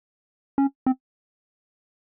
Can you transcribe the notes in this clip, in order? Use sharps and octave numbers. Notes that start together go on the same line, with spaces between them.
C#4
C4